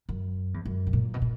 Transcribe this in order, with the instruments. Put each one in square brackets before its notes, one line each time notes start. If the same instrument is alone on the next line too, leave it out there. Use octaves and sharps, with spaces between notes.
[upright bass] F#2
E2
F#2
B2
A#2
B2
A#2